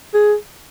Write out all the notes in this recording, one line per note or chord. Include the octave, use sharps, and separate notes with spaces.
G#4